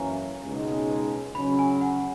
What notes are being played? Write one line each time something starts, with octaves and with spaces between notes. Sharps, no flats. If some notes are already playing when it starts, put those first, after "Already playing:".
Already playing: F#2 E3 A#3 C#4 G#5 A#5
C#2 B2 G#3 D#4
C#3 F#3 C#4 B5
G#5
F#5